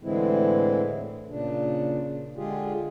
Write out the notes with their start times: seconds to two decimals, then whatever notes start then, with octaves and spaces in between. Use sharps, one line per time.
0.03 A2 D3 E3 G#3 C4 E4
1.29 A#2 C#3 D4
2.37 D3 G#3 F4 G4 G#4